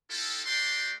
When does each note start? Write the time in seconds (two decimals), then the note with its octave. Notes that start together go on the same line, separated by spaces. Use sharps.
0.11 C4 E4 F4 G4 A4
0.46 A3 F#4 G4 D5 G5 C6